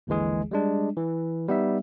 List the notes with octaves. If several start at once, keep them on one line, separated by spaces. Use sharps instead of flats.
G#1 D#2 D3 E3 G#3 G#4
G3 G#3 D4
E3
G3 B3 D#4 E5